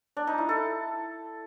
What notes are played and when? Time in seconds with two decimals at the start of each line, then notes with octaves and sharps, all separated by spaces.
0.17 D4
0.27 D#4
0.38 E4
0.49 A4